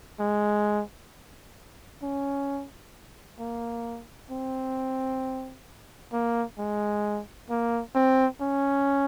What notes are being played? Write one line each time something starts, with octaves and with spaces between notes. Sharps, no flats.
G#3
C#4
A#3
C4
A#3
G#3
A#3
C4
C#4